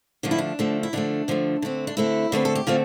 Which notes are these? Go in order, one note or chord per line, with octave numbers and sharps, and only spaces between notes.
D3 F3 A3 D4
E4
D4
D3 F3 A3
E4
D3 F3 A3 D4
D3 F3 A3
D3 A3 C4
D4
D3 A3 C4 E4
D3 A3 C4 B4
A4
G4
D3 A3 C4 F4